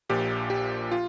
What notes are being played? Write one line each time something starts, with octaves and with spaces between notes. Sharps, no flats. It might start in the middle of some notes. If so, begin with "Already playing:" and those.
A#1 A#2 F3 G4
G4
F4